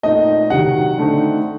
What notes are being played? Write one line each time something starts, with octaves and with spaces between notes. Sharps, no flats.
A#2 A3 C4 D#4 D#5
C3 D#3 F#3 F#5
D3 A3 C4 D#4